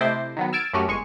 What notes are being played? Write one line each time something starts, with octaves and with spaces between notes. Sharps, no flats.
C3 A3 E4 C5 D#5 D6
D#3 F#3 B3
E6 F6 G#6 A6 D7 E7
F#2 A3 C#4 F#4 G4 F6
G1 G#3 G#5 C#6